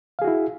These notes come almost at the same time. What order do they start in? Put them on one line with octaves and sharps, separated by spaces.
F5 G#4 F#4 E4